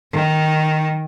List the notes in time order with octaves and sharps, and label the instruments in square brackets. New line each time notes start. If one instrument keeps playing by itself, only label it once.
[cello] D#3